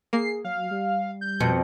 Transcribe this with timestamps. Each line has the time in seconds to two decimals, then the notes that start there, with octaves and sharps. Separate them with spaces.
0.13 A#3 G#4 C7
0.44 F#3 F5
0.71 G3
1.21 G6
1.40 F2 B2